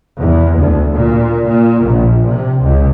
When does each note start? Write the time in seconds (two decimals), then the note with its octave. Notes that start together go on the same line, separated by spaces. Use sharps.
0.18 E2
0.56 D2
0.93 A#2
1.44 A#2
1.84 A#1
2.26 C3
2.61 C#2